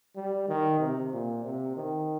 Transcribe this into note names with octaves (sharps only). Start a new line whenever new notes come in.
G3
D#3
C3
A#2
C3
D#3